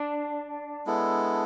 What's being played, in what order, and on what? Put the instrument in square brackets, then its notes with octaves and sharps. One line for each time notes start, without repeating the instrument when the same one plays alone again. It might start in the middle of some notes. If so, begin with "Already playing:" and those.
Already playing: [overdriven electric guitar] D4
[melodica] G#3 B3 E4 A4